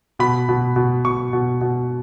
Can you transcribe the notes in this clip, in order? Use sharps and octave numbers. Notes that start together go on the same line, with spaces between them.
B2 B5
B2
B2
B2 C#6
B2
B2